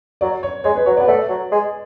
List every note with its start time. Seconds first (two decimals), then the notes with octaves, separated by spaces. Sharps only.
0.21 F#3 D5
0.43 C#5
0.64 G#3 C#5
0.75 B4
0.86 F#3 C#5
0.97 B3 D5
1.07 A3 D5
1.29 F#3
1.52 G#3